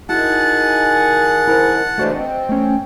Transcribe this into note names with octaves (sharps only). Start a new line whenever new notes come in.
D#3 E4 F#4 G#4 F#5 A5
E4 A#4 C5
E3 G#3 A3 D4 F#4 C5
C4 D#5
A3 C#4